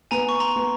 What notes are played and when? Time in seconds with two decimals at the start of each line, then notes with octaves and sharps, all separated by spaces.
0.11 B3 G#5 A#5
0.29 C#6
0.40 A#5 C6
0.56 B3